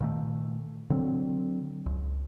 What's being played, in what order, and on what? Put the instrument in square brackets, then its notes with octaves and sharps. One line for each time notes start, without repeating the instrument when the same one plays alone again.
[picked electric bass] A#2 D#3 A3
D3 F#3 C4
C#2